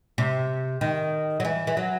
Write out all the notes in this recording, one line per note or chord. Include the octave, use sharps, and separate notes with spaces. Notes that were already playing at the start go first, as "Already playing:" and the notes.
C3
D#3
F#3
E3
E3
F#3